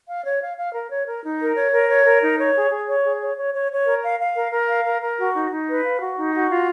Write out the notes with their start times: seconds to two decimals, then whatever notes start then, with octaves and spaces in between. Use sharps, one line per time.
0.08 F5
0.25 C#5
0.41 F5
0.57 F5
0.74 A#4
0.90 C#5
1.07 A#4
1.23 D#4
1.40 A#4
1.56 C#5
1.73 A#4
1.89 C#5
2.05 A#4
2.22 D#4
2.38 C#5
2.55 G#4
2.71 G#4
2.88 C#5
3.04 G#4
3.21 C#5
3.37 C#5
3.54 C#5
3.71 C#5
3.86 A#4
4.03 F5
4.20 F5
4.36 A#4
4.52 A#4
4.69 F5
4.85 A#4
5.02 A#4
5.18 F#4
5.35 D#4
5.51 D#4
5.68 B4
5.84 F5
6.00 F#4
6.17 D#4
6.33 F#4
6.50 F4